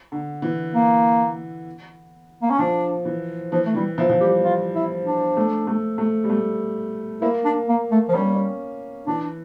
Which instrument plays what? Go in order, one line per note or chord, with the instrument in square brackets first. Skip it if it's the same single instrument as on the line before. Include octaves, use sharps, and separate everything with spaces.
[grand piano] D3
E3
[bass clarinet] A#3
A#3
C#4
[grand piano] F3 [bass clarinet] D4
[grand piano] E3
[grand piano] E3 [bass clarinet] F3
[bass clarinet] A3
[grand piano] E3 [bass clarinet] G3
[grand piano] F3 [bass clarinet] E4
[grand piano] F3
[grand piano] G3 [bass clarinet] G4
[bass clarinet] F4
E4
D4
[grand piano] A3
A3
A3
G3
A3
[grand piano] A#3 [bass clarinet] E4
[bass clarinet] D4
A#3
A3
F3
[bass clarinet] G3 [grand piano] C#4
[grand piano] A#3
C#4
[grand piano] E3 [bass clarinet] D4